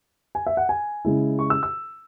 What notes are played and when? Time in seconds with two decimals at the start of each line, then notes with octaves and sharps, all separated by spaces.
0.35 G#5
0.46 E5
0.57 F#5
0.69 G#5
1.05 C#3 G#3 E4
1.39 C#6
1.50 E6
1.63 E6